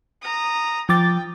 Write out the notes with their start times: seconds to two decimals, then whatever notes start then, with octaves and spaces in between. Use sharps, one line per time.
0.22 A#5 D#6
0.89 F3 G5 D6 A6